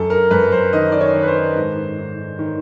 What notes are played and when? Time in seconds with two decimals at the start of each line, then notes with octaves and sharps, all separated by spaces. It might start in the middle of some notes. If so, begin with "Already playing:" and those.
Already playing: F#2 A4
0.10 A#4
0.31 F#2 B4
0.52 C5
0.73 D#3 D#5
0.92 D5
1.01 C#5
1.14 D#3
1.23 B4
1.28 C5
1.56 G#2
1.98 G#2
2.39 D#3